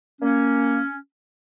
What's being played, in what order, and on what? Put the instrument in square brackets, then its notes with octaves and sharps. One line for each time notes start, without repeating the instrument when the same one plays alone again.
[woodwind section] A#3 C#4